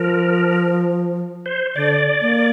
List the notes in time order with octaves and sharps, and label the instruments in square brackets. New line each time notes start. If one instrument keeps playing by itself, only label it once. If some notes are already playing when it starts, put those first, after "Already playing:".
Already playing: [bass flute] F3 [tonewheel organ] A#4
[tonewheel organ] C5
[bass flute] D3 [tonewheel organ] D5
[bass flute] A#3